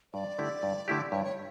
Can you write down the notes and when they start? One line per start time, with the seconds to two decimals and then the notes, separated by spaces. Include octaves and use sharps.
0.14 G2 D5
0.38 D3 A3 E4 G4
0.63 G2
0.88 D3 A3 E4 G4
1.12 G2 C#5
1.24 C#5